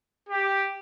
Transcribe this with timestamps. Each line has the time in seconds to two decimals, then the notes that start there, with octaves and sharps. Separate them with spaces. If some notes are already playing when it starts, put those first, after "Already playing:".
0.29 G4